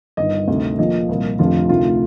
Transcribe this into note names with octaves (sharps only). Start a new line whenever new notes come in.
G1 G2 D#3 D#5
D2 C3 D#3
A#1 A#2 F3 D#5
C2 A#2 F3
F1 F2 D3 F3 F4
D2 C3 D#3 F4